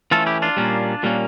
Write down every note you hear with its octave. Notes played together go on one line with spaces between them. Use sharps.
E3 A3 C#4 F4 A4
E4 G4
D4 F4
A#2 G3 A#3 C#4
A#2 G3 A#3 C#4